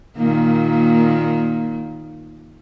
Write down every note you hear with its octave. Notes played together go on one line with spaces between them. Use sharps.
A#2 D#3 A#3